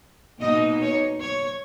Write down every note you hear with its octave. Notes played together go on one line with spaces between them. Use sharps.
B2 A#3 D#4 D#5
C#5
C#5